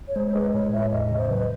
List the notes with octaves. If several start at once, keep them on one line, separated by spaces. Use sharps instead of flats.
C#5
G#3 C5
C5
G#3 B4
A2 C#5
A2 E5
E2 D#5
D#5
C#3
C5
F#3 B4